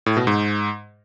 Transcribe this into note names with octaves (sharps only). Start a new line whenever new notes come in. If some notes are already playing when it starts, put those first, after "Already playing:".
A2
B2
G#2